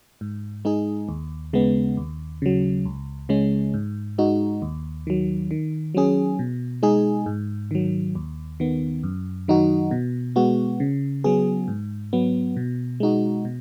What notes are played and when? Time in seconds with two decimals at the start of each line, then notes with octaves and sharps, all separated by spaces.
0.21 G#2
0.65 G#3 D#4 G#4
1.09 D#2
1.53 C#3 G#3 B3
1.97 D#2
2.42 C#3 F#3
2.86 C#2
3.29 C#3 G#3 C#4
3.74 G#2
4.18 G#3 D#4 F#4
4.62 D#2
5.07 D#3 F#3
5.51 D#3
5.95 F#3 C#4 G#4
6.39 B2
6.83 G#3 D#4 G#4
7.26 G#2
7.71 D#3 F#3
8.15 D#2
8.60 D#3 B3
9.03 F#2
9.48 D#3 F#3 D#4 F#4
9.91 B2
10.36 G#3 B3 F#4
10.80 C#3
11.24 F#3 B3 G#4
11.68 G#2
12.13 F#3 B3
12.57 B2
13.00 G#3 D#4 F#4
13.45 B2